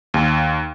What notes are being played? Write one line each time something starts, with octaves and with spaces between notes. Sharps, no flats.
D#2